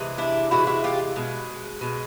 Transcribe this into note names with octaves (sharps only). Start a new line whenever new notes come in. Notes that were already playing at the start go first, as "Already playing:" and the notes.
Already playing: C3 E3 G#3
D4 E4
C3 E3 G#3 E4 F#4
E4 F#4
F4 G4
B2 G#3
B2 G#3